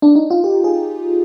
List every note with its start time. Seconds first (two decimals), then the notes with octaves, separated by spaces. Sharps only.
0.02 D4
0.15 D#4
0.30 F4
0.44 G4
0.64 G#4